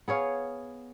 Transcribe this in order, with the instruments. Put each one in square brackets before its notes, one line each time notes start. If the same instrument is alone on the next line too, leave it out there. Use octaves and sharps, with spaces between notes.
[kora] B3 G#4 C#5 F5